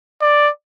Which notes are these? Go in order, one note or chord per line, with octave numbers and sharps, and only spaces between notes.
D5